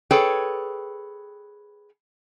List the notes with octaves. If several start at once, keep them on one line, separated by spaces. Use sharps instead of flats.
G#4 A4 B4 C#5 G5